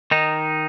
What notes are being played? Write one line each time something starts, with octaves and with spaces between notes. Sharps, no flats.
D#3 D#4